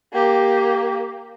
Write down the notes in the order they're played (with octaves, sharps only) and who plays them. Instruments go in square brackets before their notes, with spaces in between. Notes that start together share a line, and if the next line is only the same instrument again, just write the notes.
[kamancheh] A#3 G4